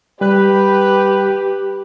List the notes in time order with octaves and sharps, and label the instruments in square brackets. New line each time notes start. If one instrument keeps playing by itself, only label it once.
[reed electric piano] G3 F#6 [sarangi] G4 [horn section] B4 [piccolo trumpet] G5